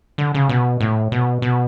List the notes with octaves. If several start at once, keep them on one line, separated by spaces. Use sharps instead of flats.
D3
C#3
B2
A2
B2
B2